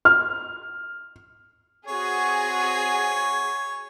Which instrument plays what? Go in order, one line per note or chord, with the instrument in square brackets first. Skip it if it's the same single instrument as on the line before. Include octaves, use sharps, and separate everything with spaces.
[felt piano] F6
[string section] C4 F#4 [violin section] G#4 [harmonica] C#5 [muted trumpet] G#5